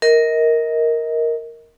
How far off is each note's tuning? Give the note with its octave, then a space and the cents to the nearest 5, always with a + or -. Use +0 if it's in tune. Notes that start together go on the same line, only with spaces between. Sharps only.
A#4 +0 D#5 +30